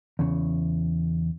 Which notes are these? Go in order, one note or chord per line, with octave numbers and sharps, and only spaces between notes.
E2 C#3